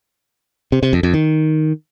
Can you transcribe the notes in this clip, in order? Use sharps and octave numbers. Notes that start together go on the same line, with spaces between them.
C3
C3
F2
F2
D#3